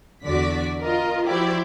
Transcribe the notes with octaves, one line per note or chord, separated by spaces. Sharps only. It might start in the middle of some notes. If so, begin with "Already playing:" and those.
E2 D3 F#4 D5 B6
F4 A#4 D#5
F3 E4 F#4 G4 C5 D5